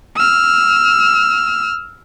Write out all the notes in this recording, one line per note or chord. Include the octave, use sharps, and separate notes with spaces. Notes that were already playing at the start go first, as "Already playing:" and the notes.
E6 F6